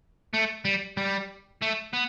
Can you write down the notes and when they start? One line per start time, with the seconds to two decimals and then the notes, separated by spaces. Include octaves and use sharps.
0.33 A3
0.65 G3
0.97 G3
1.62 A3
1.93 B3